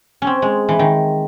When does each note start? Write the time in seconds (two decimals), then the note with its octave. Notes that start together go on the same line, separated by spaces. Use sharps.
0.22 C#4
0.27 C4
0.42 G#3
0.69 E3
0.79 D#3